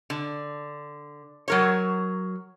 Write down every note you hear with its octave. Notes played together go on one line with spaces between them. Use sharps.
D3
F#3 A#4 C#5